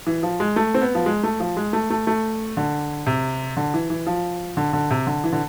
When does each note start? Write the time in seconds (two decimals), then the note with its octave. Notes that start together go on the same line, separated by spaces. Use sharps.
0.07 E3
0.23 F3
0.40 G#3
0.56 A3
0.74 C4
0.81 B3
0.95 F3
1.06 G#3
1.23 A3
1.40 F3
1.57 G#3
1.73 A3
1.90 A3
2.07 A3
2.57 D3
3.06 C3
3.57 D3
3.74 E3
3.90 E3
4.07 F3
4.57 D3
4.73 D3
4.91 C3
5.07 D3
5.24 E3
5.32 D3